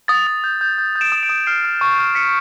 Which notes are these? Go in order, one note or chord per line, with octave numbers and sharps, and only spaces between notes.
D#6 A6
D#6
G6
G6
G6
G6
D7 E7
D#6
D7 E7
D#6
F6 C7 D7
F6
C#6
F6
F6 B6 C#7